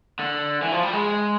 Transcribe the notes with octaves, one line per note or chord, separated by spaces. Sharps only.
D3
E3
F3
G3
G#3